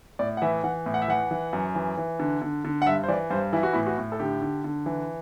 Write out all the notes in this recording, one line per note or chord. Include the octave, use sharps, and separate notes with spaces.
A2 D5
F#5
E3 E5
E3 F#5
A2
F#5
E5
E3 F#5
E3
F#2
E3
E3
D3
D3
D3
F#5
G2 E5
C5
E3 D5
G2 C5
E3 E4
F#4
A2 E4
F#4
A2
A4
D3 G4
D3
D3
E3